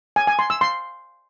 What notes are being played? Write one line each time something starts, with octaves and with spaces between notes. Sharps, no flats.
G#5
G#5
C6
E6
C6